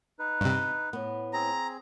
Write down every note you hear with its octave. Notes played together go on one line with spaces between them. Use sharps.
D#4 B4
G2 C3
A2 B3
C4 G#4 A#5